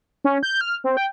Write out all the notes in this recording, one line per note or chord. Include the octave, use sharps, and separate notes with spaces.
C#4
G6
F6
C4
G5